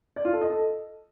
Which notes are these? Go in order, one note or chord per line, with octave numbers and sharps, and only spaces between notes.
D5
F4
A4
D#5
A4